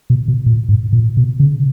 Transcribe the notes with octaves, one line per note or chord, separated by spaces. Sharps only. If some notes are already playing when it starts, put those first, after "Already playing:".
B2
B2
A#2
G#2
A#2
B2
C#3